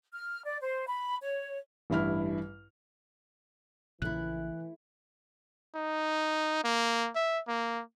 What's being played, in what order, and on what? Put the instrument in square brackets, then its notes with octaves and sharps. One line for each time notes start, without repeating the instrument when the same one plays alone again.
[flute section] F6
D5
C5
B5
C#5
[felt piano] A1 G2 E4 F6
[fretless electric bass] A#1 A#2 C#3 [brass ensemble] E3 [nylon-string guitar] A3 E4 [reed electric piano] F#6
[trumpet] D#4
A#3
E5
A#3